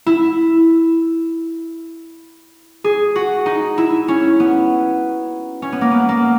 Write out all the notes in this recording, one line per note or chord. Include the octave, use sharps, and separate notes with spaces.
E4
G#4
F#4
D#4
E4
C#4
B3
C#4
B3
A#3
B3
A#3